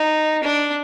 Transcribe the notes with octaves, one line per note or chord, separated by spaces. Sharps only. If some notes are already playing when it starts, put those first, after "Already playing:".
Already playing: D#4
D4